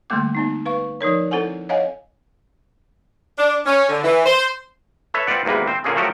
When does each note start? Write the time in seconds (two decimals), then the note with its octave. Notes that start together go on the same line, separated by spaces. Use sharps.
0.10 D3 G3 A3 A#3 D6
0.35 B3 C4 D#4
0.66 B4 F5 C#6
1.01 F3 D#4 A#4 C#5
1.31 C4 E4 A4 C5 F#5 G#5
1.69 C#5 D#5 F5 F#5 G#5
3.38 D4
3.66 C#4
3.89 D3
4.04 E3
4.26 C5
5.14 A4 B4 C#5 E5
5.27 C4 F4 B4 D5 F#5
5.45 G#1 E2 C3 A#3 B4
5.68 C4 C5
5.84 A#2 D3 A#3 C#4 G#4
5.96 F3 F#3 A3 F#4 G4 A#4